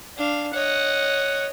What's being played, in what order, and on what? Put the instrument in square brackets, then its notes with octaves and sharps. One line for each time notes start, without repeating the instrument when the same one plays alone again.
[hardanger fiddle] D4 F5
[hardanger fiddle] C#5 D#5 [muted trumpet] F#5